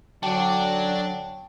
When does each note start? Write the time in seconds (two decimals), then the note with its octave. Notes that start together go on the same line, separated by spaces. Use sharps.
0.23 D3 F#3 D4 D5 G5 A5